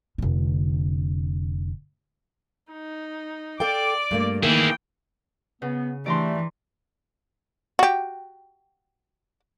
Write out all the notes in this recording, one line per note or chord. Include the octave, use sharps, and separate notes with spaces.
F1 D3
D#4
A4 D5 F5 G5 D6
G2 A3 A#3
D#3 E3 A#3 G#4 E5 G5
C#3 B3
E3 G3 A3 D4 D5 A#5 C6
F#4 G4